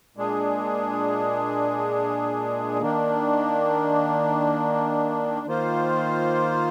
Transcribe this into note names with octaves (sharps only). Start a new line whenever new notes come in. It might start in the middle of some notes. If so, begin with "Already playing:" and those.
A#2 G#3 D4 G#4
D#3 A#3 D4
D#3 A#3 F4 C5